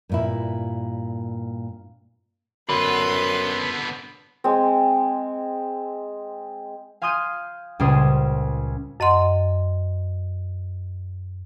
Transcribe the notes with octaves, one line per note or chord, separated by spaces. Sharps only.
G2 A#2 E4
F#2 D3 B3 B4 C6
G#3 C4
F5 G#5 C6 D#6 G6 D#7
C#2 A#2 G3 G#4 C5 D#6
F#2 D#5 F#5 C6